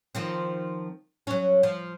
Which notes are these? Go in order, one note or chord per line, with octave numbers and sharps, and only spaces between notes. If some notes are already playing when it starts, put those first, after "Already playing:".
D#3 F3 C4
F#3 C#4
F3